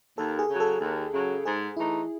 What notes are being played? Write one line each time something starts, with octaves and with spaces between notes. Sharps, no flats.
D#2 A4
G#4
C#3 F#3
A4
D#2
C#3 F#3
G#2 G#4
E3 A3 D#4 E4